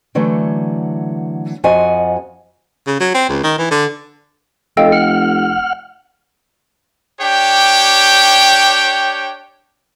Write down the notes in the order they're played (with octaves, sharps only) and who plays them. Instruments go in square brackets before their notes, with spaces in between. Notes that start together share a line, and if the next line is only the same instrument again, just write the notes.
[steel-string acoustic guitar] D3 E3 F#3 A3
F2 F3 F#4 D#5 G#5
[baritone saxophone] C#3
F#3
C4
C#2
D#3
E3
D3
[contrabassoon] F1 [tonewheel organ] A4 [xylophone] D#5 F5 G5
[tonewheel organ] F#5 F6
[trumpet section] D4 G4 C#5 G5